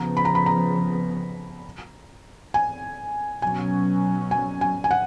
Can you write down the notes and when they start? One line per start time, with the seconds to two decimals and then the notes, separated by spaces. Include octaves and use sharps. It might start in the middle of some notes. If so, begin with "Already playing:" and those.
Already playing: C#3 F3 B3 A#5
0.17 B5
0.25 A#5
0.35 B5
0.46 A#5
2.54 G#5
3.42 B2 F#3 C#4 G#5
4.31 G#5
4.61 G#5
4.84 G#5
4.91 F#5